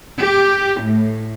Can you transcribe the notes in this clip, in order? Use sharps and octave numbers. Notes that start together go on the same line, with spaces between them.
G4
A2